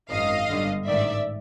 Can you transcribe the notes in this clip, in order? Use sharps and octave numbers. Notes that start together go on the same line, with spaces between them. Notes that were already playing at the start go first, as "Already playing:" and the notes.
G#1 F#2 D#3 D#5 F5
G1 G2 D3
A1 G#2 D#3 D5 E5